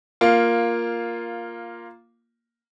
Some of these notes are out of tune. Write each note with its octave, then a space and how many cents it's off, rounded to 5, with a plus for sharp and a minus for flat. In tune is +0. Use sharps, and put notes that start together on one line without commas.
A#3 +5 F4 +0